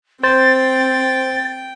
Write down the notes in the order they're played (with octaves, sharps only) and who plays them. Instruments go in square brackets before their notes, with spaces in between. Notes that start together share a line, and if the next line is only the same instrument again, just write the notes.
[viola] C4 [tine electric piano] C5 [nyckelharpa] G5 [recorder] A6